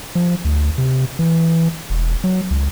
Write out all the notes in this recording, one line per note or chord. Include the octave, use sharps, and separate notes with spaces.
F3
D2
C3
E3
E1
F#3
C#2